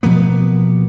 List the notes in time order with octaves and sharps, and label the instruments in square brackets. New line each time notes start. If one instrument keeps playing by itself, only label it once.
[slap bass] B2 F3 A#3 B3